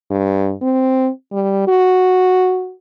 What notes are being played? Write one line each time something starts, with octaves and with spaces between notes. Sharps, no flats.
G2
C4
G3
F#4